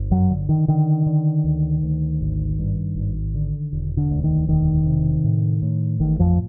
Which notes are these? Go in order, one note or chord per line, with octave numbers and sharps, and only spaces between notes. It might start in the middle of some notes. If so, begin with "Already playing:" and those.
Already playing: G1
F#2 F#3
D3
D#3
D3 D#3
D3
D2
D2
G#1
G2
G#1
D3
E1
D3
D2
D#3
E1 D#3
C3
A2
A2
A1 D#3
F2 F3